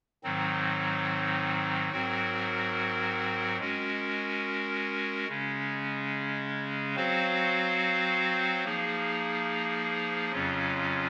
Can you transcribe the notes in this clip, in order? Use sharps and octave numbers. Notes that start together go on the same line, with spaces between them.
G#2 D#3 F#3 C4 D#4
G#2 F#3 C4 F#4 A#4
G#3 C#4 F#4 A#4
C#3 G#3 C#4
F#3 C4 F#4 C5 F5
F3 A#3 D#4 G#4
F2 C#3 F#3 C#4 F4